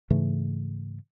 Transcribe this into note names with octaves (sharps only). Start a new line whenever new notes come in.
G#2 C#3 E3 A3